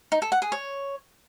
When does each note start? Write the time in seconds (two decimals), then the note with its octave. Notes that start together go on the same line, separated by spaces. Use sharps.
0.12 D#4
0.22 A4
0.32 F#5
0.42 G#4
0.52 C#5